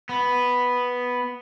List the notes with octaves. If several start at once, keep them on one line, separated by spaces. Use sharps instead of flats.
B3